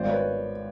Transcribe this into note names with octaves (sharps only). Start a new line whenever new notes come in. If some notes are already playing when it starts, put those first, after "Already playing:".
Already playing: G#1 C5 D5
B4 C#5